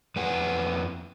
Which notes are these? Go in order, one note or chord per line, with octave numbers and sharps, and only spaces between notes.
F2 B4 F#5 G#5